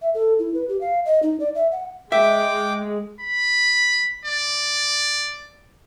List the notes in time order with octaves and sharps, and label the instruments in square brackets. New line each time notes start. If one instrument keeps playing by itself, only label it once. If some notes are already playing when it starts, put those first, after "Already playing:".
[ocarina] E5
A4
E4
B4
G4
F5
D#5
D#4
D5
E5
F#5
[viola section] G#3 [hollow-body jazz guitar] E5 [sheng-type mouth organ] G5 D6
[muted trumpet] B5
D5